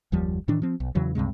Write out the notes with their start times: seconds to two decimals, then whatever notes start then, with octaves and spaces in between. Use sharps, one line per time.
0.12 F#1 D#2 F3 G3
0.48 A2 D#3 E3 D4
0.62 F3 C4
0.80 B1
0.95 E2 C#3 E3 F#3
1.15 C#2 G2 C3 G#3